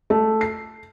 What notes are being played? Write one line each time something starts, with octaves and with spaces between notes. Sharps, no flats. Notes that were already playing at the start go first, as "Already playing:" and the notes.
A3
C7